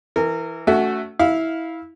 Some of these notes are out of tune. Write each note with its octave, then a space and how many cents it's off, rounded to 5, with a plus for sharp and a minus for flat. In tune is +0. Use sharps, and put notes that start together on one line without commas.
E3 +0 A#4 -25
A3 +0 C#4 +35 F#4 +0
E4 -15 F5 +0